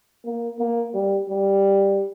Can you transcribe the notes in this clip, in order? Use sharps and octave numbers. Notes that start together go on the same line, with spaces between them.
A#3
A#3
G3
G3